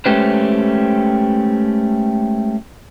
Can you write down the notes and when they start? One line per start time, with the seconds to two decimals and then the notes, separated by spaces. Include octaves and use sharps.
0.06 G#3 A3 C#4 G4 B4 C5